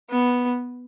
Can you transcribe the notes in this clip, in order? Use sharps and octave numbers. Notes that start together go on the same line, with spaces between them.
B3